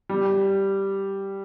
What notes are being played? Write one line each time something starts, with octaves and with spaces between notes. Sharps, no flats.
G3